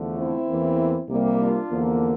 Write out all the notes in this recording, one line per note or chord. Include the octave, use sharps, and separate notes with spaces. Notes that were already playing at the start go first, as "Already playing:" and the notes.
Already playing: E2 D3 F3 A3
C4 E4
E2 E3 A#3
C2 C3 G3 A#3
D4 F4
E2 D3 F3 A#3